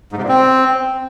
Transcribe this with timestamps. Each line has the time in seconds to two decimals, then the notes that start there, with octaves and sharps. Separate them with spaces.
0.12 G#2
0.18 C3
0.23 A#2
0.28 C4